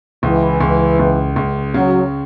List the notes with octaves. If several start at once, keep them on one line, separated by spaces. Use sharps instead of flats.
C#2 E3
C#2
C#2
C#2
C#3 F#3